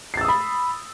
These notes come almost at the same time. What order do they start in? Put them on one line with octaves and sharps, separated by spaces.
C7 A6 E6 D#6 B5